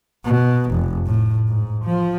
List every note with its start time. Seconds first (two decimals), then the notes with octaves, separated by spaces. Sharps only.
0.25 B2
0.71 F1
1.06 A2
1.48 G#2
1.85 F3